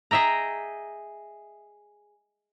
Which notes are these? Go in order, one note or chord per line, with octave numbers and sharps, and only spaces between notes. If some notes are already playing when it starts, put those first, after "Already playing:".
G#4 D#5 E5 G5 A#5